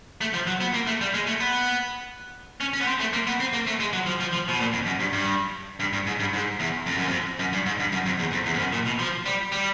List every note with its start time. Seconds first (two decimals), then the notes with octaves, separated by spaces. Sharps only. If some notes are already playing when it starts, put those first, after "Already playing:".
0.21 A3
0.34 F3
0.47 F#3
0.61 B3
0.74 A#3
0.87 A3
1.01 G3
1.14 G#3
1.27 A3
1.40 B3
2.61 C#4
2.74 C#4
2.81 B3
2.87 C4
3.00 A3
3.13 A#3
3.27 B3
3.40 C4
3.53 A#3
3.67 A3
3.80 G#3
3.93 F#3
4.06 F3
4.20 F3
4.33 F3
4.48 B2
4.60 A#2
4.73 F2
4.86 F#2
5.00 G2
5.13 G2
5.80 G2
5.93 G2
6.07 G#2
6.20 G2
6.33 G#2
6.60 E2
6.86 F2
6.97 F#2
7.08 F2
7.39 F#2
7.53 G2
7.66 G#2
7.80 G2
7.92 F#2
8.06 F2
8.19 E2
8.32 F2
8.46 E2
8.54 F2
8.59 F#2
8.73 A#2
8.86 B2
8.99 F3
9.26 G3
9.52 G3